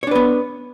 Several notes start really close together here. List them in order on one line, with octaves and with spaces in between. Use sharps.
C#5 D4 B4 B3